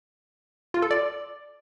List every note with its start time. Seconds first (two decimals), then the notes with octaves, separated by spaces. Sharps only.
0.74 F4
0.82 A4
0.91 D5